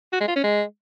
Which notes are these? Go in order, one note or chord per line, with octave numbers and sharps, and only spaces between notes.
F#4
G#3
F4
C#4
G#3